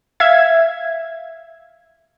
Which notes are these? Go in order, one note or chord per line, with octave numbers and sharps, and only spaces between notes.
E5 F5 G#6